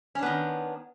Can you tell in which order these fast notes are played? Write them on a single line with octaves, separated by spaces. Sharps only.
C#4 D4 B3 D#3